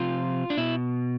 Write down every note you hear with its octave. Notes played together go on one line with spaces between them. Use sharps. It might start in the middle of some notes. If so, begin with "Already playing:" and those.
Already playing: C3 F3 F4
D4
B2 E4